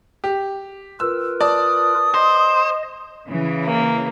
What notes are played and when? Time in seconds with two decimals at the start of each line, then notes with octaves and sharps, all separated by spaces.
0.24 G4
1.00 F4 A#4 B4 E6
1.41 D5 A5 D#6
2.14 C5 D#5
3.28 C#3 E3
3.65 A#3